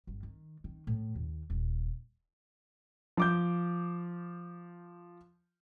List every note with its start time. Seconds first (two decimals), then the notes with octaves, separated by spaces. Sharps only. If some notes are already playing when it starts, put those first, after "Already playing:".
0.07 G1
0.23 D#3
0.64 D#3
0.87 A2
1.15 D#2
1.50 D#1
3.17 F3 D6 G6